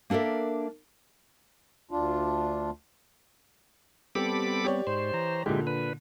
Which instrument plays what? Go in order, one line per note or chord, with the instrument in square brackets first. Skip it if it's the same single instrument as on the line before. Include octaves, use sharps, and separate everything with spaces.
[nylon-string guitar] A#3 D4 A4 A#4 E5
[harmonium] D2 D4 F4
[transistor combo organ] G3 B3 C4 [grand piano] G4 [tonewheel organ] A4 B5 D6
[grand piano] G4 C#5 D5
[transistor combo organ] G#2 [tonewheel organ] C5
[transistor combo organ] E3 A#5
[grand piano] A#2 D3 [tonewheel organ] G#3 G4 [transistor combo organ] E4
[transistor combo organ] D4 [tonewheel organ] B4